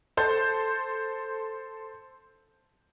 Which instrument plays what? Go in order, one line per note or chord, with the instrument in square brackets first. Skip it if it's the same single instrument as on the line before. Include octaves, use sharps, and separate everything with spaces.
[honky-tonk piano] A4 C5 A5 G6